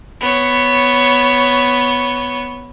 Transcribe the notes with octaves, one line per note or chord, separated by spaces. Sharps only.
B3 C#5